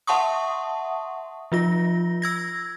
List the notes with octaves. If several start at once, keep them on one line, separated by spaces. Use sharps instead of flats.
E5 F#5 A5 C6 C#6 D#6
F3 F4 A#6
E6 G#6 A#6